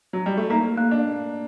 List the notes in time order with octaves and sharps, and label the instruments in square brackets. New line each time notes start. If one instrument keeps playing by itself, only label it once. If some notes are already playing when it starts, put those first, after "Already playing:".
[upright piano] F#3
G3
A3
[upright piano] A#3 [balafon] D#4
[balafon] A#3
[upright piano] D4